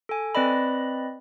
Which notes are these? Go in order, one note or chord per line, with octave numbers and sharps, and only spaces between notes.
A4 G#5
C4 B4 D5 D#5 B5